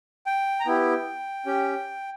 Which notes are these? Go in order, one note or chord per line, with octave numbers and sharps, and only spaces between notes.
G5
A#5
B3 E4 G4 G5
C#4 G4